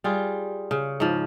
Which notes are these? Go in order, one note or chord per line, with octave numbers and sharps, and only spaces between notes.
G3 F4 G#4
C#3
G#2 F3